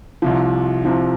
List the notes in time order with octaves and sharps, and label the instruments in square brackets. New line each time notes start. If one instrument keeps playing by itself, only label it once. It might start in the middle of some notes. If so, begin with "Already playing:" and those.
[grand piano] C2 C3 F3
C2 C3 F3